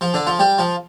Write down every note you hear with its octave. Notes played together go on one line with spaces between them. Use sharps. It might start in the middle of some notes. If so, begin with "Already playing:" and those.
F3 F4
D3 D4
F3 F4
G3 G4
F3 F4